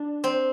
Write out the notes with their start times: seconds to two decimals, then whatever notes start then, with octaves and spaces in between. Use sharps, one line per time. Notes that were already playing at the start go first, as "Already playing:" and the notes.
Already playing: D4
0.24 C4